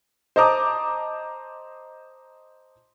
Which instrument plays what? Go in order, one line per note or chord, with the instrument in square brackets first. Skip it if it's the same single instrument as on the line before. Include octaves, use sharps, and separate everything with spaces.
[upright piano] C5 D#5 A5 A#5 D6 D#6